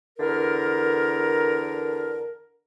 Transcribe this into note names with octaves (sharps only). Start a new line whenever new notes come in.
E2 D3 A#4